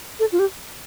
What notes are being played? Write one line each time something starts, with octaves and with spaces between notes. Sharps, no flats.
A4
F4
G4